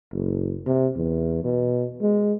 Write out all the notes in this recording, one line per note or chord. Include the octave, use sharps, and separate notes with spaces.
F#1
C3
E2
B2
G#3